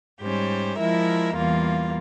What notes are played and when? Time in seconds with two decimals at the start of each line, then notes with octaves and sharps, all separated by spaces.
0.21 G#2 G3 C#4 G4 C5
0.78 F3 G#3 E4 A#4 E5
1.35 E2 E3 G3 A#3 F4